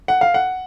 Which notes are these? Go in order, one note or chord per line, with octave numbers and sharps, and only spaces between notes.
F#5
F5
F#5